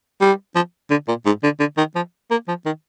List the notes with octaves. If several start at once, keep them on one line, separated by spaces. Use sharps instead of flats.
G3
F3
D3
A#2
G#2
D3
D3
D#3
F3
A#3
F3
D#3